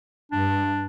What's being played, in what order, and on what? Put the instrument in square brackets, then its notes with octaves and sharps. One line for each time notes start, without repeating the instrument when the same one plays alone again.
[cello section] G2 [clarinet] D4